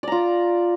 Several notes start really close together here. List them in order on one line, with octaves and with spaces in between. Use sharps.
D5 A#5 F4